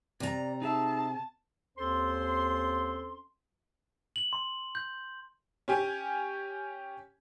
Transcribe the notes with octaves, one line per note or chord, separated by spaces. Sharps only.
C3 D5 A#5
D#4 G#4 E5 A5
D#2 C4 C#4 A4 C5 C6
F#7
C6
G6
C#4 G4 G#5